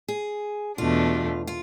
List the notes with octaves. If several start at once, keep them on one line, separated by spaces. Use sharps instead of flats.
G#4
E2 B2 A3 D4 F4
F4